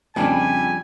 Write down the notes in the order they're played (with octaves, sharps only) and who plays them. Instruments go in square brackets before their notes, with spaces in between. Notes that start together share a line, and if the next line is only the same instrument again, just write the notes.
[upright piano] F2 C#3 [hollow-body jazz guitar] F3 G3 D4 [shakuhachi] G5 [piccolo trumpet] G#5